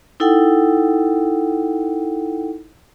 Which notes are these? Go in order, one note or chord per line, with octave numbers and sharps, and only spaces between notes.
D#4 E4 A4 F#5 G5